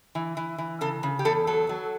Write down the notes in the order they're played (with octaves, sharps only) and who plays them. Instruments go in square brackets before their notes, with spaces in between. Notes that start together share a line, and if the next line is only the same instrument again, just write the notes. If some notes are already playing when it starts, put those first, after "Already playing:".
[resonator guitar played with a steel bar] E3
E3
E3
C#3 A4
C#3
G4
E2 A4
F#3 A4
F#3